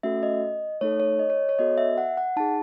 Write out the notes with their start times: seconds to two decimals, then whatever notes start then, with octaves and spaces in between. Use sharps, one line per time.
0.03 A3 C#4 F#4 A4 E5
0.23 D#5
0.81 A3 D#4 A4 C#5
1.00 C#5
1.19 D#5
1.30 C#5
1.49 C#5
1.59 B3 F#4 A4 D#5
1.78 E5
1.98 F#5
2.17 F#5
2.37 D#4 G#4 A5